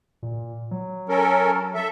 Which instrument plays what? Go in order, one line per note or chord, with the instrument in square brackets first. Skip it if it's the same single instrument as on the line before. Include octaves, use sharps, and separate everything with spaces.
[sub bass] A#2
F#3
[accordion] C#4 A4 A#4
A4 E5